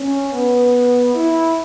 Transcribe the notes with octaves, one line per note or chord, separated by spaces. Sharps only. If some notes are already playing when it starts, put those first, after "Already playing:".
Already playing: C#4
B3
E4